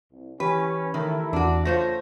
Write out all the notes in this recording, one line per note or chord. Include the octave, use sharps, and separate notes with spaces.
C2
E3 C#4 G4 B4 B5
D#3 A3 E4 A#4
E2 D4 F#4
A3 F4 C5 C#5 A#6